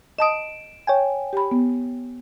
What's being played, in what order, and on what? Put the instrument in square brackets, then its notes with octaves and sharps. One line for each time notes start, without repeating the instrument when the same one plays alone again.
[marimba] D#5 A5 D#6 [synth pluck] D7 E7
[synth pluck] C#5 G5 G#5
[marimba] G4 B5
B3